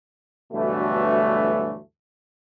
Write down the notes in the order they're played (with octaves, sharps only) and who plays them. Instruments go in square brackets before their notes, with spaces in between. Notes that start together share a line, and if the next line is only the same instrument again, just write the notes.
[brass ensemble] D2 G2 B2 E3 F#3 A3